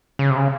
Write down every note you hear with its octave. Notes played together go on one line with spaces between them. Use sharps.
C#3
C3
C#3